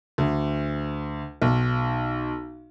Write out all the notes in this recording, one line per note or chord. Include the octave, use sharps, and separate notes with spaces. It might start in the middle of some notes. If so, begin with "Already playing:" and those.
D2
B1